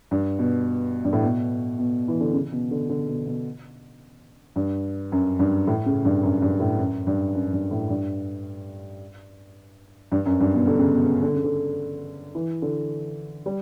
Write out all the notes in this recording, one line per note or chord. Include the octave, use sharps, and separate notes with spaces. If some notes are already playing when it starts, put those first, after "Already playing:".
G2
B2
G2
A2
B2
B2
E3
D3
C#3
B2
D3
D3
B2
B2
G2
F#2
G2
A2
C#3
G2
F#2
G2
A2
F#2
G2
F#2
G2
A2
G2
G2
F#2
G2
B2
D3
C#3
B2
C#3
D3
C#3
D3
E3
D3
G3